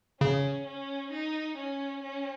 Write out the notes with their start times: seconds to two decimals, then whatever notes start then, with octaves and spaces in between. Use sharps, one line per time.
0.21 C#3 C#4
0.66 C#4
1.12 D#4
1.57 C#4
2.02 C#4